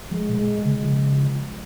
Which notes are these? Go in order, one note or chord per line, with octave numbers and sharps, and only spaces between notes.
F3 G#3
A#2
G#3
G#3
C#3
C#3 F3